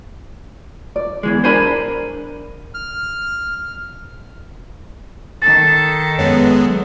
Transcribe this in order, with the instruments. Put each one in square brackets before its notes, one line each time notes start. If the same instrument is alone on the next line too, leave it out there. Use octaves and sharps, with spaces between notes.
[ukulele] D5
[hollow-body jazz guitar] E2 E3 G#3
[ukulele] D4 A#4 D5 [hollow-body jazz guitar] C5 G#5 B5
[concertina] F6
[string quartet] D#3 A4 [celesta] A6
[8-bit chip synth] F#2 G#3 B3 [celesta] C#5